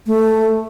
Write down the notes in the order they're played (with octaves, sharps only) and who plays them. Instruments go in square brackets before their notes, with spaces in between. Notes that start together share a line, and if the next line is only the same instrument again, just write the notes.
[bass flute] A3